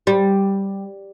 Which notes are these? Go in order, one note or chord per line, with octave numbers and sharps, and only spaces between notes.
G3